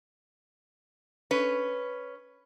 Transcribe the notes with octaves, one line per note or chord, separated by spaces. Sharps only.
C#4 B4